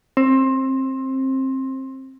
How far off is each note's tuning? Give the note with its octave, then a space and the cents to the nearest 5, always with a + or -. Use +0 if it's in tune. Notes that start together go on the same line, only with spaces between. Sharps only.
C4 +20